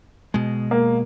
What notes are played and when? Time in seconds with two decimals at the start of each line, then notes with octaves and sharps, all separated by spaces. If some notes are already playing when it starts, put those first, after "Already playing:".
0.34 B2 G#3
0.71 A#3